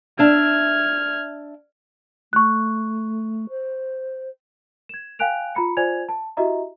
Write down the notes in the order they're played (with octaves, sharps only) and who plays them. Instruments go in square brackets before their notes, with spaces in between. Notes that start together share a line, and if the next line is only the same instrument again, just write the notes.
[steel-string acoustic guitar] D4 E5 [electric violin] F6 G#6
[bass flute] A3 [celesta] C#6 F#6
[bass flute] C5
[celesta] G#6 E7
F5 G5 G#5 F#6 D7 F7
F4 A#5 B5 C#7
F4 C5 D5 G#5 G#6 F7
A5
E4 F#4 G4 D#5 E5 A#5